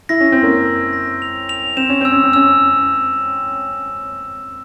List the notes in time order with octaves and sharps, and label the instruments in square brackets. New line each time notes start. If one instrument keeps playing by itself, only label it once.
[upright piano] E4 [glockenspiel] A#6
[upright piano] C#4
C4
[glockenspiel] E6
[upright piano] A#3 C#4
[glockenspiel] E6
A#6
F7
F7
[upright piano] C4 [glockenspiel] E7
[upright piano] C#4
[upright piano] C4 [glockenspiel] E6
[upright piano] C#4
C4
[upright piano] C#4 [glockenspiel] E6